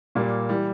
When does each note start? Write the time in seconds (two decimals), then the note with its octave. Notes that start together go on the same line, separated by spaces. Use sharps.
0.15 A#2 G3 A#3
0.49 E3 G3